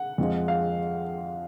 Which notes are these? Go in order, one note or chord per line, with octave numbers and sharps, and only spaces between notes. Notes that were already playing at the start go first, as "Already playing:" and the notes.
Already playing: F#5
F2 F3 G#3
F5